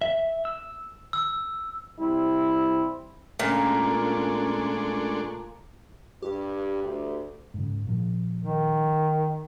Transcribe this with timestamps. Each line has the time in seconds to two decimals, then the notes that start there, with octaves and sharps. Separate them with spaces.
0.01 E5
0.45 E6
1.13 E6
2.00 C3 G3 C4 E4
3.39 A#2 G#3 A3 C#4 D4
6.22 G2 G4
6.84 D2
7.54 G#2 C#3
7.87 A#2 F3
8.41 D#3